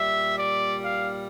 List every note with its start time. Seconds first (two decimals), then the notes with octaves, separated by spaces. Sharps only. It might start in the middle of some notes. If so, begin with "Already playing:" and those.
Already playing: A#2 G3 E5
0.38 D5
0.82 F5